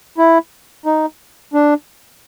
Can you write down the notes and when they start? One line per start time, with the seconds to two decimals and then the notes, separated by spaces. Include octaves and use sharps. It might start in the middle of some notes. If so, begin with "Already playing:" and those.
0.18 E4
0.86 D#4
1.54 D4